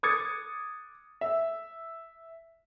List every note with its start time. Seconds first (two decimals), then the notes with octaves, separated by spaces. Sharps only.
0.03 D6 D#6 G#6 A6 C#7
1.21 E5